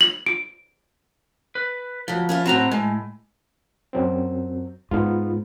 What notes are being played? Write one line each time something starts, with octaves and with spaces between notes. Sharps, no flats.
F#7
D7
B4
D2 F3 F#3
C#4 E4 F4
A2 F#3 C4 F#4 A#5
A2 G#3
F#2 F#3 C4
G#2 B3 F4